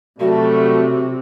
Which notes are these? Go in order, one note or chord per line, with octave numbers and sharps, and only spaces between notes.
C3 F#3 G3 A3 F#4